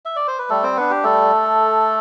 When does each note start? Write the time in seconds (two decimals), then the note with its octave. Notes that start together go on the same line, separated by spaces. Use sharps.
0.05 E5
0.16 D5
0.28 C5
0.39 B4
0.50 G3 A3 A4
0.63 C4 C5
0.77 B3 D4 B4
0.91 G4
1.04 G3 A3 A4